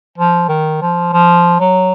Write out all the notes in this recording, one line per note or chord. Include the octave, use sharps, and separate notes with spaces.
F3
D#3
F3
F3
F#3